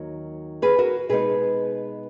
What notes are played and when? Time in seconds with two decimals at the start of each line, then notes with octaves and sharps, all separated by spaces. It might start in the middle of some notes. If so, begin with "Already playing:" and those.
Already playing: D#2 D#3 F#3
0.62 G#4 B4
0.79 F#4 A#4
1.09 B2 G#3 B3 D#4 G#4 B4